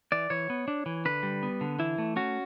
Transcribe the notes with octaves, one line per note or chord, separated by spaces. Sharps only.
E3 D5
E3 C#5
B3
D4
E3
D3 B4
G3
B3
D3
E3 E4
A3
C#4 F#4